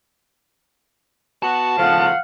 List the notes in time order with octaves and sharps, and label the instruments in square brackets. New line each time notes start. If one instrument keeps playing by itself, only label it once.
[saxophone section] B3 F#4 [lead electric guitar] A5
[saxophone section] A2 C#3 F3 [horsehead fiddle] F5 F#5